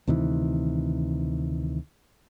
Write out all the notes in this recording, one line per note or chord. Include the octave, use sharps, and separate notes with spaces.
D2 C3 D#3 E3